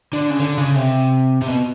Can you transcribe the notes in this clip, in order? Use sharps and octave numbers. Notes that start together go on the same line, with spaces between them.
D3
C#3
D3
C#3
C3
C3
B2